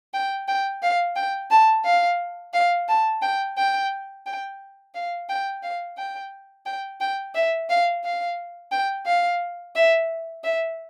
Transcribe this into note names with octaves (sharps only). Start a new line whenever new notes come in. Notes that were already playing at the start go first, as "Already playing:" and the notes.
G5
G5
F5
G5
A5
F5
F5
A5
G5
G5
G5
F5
G5
F5
G5
G5
G5
E5
F5
F5
G5
F5
E5
E5